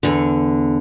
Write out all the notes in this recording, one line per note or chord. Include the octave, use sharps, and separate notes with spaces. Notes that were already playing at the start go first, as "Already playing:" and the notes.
E2 D3